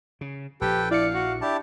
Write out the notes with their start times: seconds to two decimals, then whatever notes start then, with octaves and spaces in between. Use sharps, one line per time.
0.21 C#3
0.61 A#1 F3 G4 A4 B4 G5
0.91 E4 D5 F5 C#7
1.14 F#4
1.41 D4 E4 G4 A5